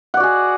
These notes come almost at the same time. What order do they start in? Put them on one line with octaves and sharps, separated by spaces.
F#5 D5 F#4 G#4